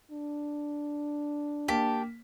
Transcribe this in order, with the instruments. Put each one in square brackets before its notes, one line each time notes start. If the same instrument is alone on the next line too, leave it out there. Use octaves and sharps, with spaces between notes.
[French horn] D4
[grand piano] A#3 B6 [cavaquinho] G4 A5